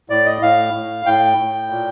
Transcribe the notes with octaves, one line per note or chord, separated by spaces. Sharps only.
A2 D5
D#5
A2 F5
A2
A2 G5
A2
A#2